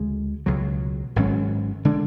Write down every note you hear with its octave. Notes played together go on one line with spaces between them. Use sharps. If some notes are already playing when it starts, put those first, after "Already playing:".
Already playing: D2 C#3 G#3
C#2 B2 F#3
G#1 G#2 F#3 C#4
D3 G#3 D4